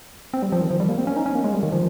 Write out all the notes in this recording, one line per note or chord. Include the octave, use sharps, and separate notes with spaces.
C4
G3
F3
D#3
F3
G3
A#3
C4
C#4
D#4
C#4
A#3
G#3
G3
D#3
F3